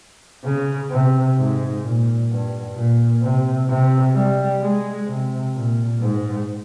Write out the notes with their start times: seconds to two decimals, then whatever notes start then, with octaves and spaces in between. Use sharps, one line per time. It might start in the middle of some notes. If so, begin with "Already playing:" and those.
0.45 C#3
0.91 C3
1.37 G#2
1.83 A#2
2.30 G2
2.76 A#2
3.22 C3
3.69 C3
4.15 G3
4.62 G#3
5.07 C3
5.53 A#2
6.00 G#2